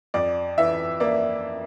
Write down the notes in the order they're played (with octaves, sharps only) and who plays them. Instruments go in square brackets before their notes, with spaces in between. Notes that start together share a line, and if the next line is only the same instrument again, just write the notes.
[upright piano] F2 D5
E3 E5
A#3 D5